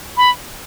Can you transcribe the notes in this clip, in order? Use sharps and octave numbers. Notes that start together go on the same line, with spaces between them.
B5